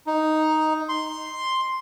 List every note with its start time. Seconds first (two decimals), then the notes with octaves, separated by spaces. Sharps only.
0.07 D#4
0.89 C6